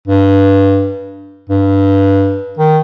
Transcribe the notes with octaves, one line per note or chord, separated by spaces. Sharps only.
G2
G2
D#3